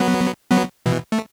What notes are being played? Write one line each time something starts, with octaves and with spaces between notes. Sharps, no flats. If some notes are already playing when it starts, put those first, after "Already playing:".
Already playing: F#3 B3
F#3 B3
B2 E3
A3